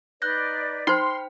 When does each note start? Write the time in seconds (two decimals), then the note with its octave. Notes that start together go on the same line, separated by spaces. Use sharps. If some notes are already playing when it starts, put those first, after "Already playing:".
0.22 D#4 B4 D5 F#6 G6 A#6
0.87 D#4 C5 G5 B5 C6 F6